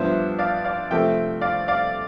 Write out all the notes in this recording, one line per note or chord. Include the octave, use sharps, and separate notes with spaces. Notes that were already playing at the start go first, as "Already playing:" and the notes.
Already playing: G2 F3 B3 D4 C5 E5
D5 F5
D5 F5
C3 F3 A3 C4 E5 G5
D5 F5
D5 F5